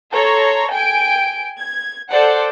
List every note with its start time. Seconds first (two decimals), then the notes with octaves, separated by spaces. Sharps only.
0.12 A4 C#5 A#5 C6
0.72 G5 G#5 D7
1.59 G#6
2.11 A4 C5 D5 F#5